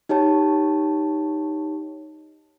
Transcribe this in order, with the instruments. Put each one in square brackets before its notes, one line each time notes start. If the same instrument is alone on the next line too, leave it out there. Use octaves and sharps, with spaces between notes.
[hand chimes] D#4 G4 C#5 A5